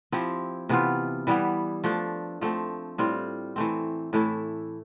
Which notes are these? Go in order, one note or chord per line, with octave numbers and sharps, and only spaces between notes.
F3 C4 E4 G4
C3 E3 B3 F4
E3 G3 B3 E4
F3 A3 D4
F3 A3 C4
A2 G3 C4 F4
E3 A3 C4
A2 E3 A3 E4